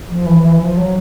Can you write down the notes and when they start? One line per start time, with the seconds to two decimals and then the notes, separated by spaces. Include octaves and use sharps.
0.10 F3
0.26 E3
0.43 E3
0.56 E3
0.60 F3
0.77 F#3